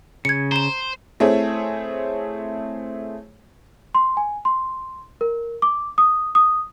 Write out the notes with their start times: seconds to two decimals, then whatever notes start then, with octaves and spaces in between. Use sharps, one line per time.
0.25 C#3 G#6 C#7
0.52 C5 A#5 E7
1.20 A3 C4 E4 G#4 C#5
3.95 C6
4.17 G#5
4.45 C6
5.21 A#4
5.62 D6
5.98 D#6
6.35 D#6